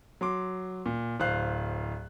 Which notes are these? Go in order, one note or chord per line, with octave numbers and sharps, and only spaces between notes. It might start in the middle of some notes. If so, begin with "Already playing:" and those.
F#3 C6 D6
A#2
D1 C5 F5 F#6 C7